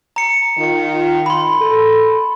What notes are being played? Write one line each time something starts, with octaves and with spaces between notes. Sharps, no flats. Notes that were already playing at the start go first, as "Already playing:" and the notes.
A#5 C#7
D#3 F4
B5 C6
A4